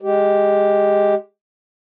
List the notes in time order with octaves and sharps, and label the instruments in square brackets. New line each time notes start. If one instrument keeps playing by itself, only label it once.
[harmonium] G#3 G4